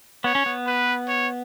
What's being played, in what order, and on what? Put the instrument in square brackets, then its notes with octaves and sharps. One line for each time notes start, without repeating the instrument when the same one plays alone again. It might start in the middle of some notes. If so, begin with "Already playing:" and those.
[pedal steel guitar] B3 [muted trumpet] C#5
[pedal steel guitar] C#4
B3
[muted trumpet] B4
C#5